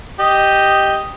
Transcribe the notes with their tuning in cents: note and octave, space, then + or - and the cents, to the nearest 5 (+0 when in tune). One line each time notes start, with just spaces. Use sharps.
G4 +0 D#5 +0